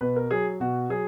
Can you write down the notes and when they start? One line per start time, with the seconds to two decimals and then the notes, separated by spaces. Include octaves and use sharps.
0.01 B2 B4
0.16 A#4
0.31 F#3 G#4
0.60 B2 F#4
0.89 F#3 G#4